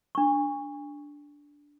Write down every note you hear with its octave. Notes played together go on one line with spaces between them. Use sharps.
D4 C#6